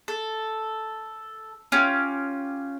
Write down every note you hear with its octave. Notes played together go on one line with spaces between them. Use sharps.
A4
C#4 F4 G4